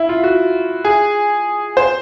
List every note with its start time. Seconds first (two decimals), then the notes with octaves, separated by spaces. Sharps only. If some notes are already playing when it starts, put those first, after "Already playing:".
Already playing: E4
0.09 F4
0.24 F#4
0.85 G#4
1.77 C5